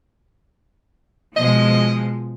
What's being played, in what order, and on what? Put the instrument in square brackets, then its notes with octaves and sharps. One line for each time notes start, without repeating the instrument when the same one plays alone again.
[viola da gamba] B2 [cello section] F3 G#3 [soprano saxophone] D#5